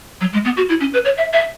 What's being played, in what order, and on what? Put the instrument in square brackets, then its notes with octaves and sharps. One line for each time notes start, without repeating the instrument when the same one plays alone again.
[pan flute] F#3
G#3
B3
F#4
E4
C#4
B4
C#5
E5
E5